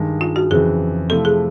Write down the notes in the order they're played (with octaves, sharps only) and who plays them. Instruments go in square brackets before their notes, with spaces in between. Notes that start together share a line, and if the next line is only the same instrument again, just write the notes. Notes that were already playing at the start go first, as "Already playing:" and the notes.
Already playing: [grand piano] G2 D#3 G#3
[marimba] F4
F#4
[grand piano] F2 C#3 E3 [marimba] G#4
[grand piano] C3 F3 A3 C4 E4 [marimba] A4
[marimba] G#4